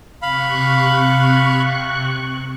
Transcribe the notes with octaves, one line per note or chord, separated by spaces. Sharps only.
C3 F5 B5 C#6 F#6